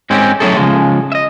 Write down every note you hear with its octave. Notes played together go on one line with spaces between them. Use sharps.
G#2 G#3 C4 C#4 G4
F#3 A3 C#4 E4 G#4 A4
C#3 F3 G#3
D#5 E5